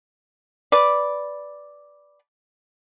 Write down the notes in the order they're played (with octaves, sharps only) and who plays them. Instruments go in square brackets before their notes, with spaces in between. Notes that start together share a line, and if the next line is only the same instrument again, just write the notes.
[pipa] B4 D5